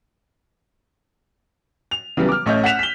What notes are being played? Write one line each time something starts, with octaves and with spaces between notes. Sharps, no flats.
F7
C#3 E3 F#3 G3 B3
D6 F6
A1 A3 C#5 D#5 E5 G6
F#5 F#6 B6 E7 F7
B6 G7